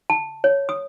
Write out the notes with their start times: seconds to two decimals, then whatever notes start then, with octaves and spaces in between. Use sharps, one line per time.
0.10 A5
0.44 C#5
0.69 D#6